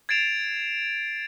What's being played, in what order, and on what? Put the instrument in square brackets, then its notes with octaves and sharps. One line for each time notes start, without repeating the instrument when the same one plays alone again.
[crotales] G#6 A6 C7 D7 E7 F7